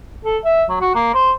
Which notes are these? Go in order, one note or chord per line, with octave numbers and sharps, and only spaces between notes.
A4
E5
F#3
F#4
A#3
C5